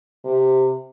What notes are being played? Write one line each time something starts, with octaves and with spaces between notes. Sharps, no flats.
C3